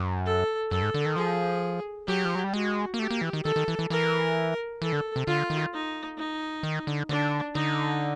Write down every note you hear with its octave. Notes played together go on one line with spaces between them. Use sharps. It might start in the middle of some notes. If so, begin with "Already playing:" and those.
Already playing: F#2
A4
F#2 A4
G#2
D3
D#3
F3 G#4
F#3 G4
F3
F#3
G3
G#3 F#4
A#3
A3 G4
A#3
E3
D#3
D#3 A4
D#3
E3
E3
E3 A#4
E3 A4
D3
C3
D3 F4
D#3
D#4
D#4
D#3
D3
D3 D4
D3 D#4